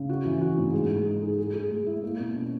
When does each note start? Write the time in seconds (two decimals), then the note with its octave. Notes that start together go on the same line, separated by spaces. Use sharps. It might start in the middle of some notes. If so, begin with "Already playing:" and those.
Already playing: C#3
0.09 F#4
0.26 E3
0.41 F#4
0.58 G#2
0.74 G#3
0.90 G#3
1.06 D#4
1.22 G#4
1.38 G#4
1.54 G#4
1.71 G#3
1.86 E4
2.04 A#3
2.19 B2
2.35 C#4